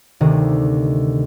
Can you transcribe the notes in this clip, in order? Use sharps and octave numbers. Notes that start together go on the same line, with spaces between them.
D2 C3 D#3